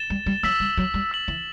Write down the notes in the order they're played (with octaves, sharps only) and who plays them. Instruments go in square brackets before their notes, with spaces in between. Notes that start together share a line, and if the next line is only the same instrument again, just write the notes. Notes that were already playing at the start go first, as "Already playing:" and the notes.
Already playing: [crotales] A6 E7 G7
[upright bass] G3
G3
[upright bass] F#3 [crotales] E6 B6 F#7
[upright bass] G3
F#3
G3
[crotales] E6 B6 F#7
[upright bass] E3